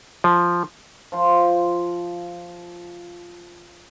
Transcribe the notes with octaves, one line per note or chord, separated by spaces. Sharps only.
F3
F3 C6